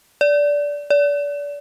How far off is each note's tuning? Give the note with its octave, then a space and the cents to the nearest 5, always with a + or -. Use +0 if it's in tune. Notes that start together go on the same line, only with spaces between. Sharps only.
D5 -15
D5 -30